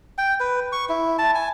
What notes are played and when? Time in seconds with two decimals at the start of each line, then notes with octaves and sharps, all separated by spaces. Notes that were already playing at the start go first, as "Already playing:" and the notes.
0.18 G5
0.40 B4
0.72 C#6
0.89 E4
1.19 A5
1.35 G#5